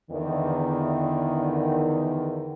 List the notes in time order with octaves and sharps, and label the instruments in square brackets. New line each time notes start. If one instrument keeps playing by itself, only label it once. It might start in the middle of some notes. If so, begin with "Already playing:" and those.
[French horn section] E2 D3 D#3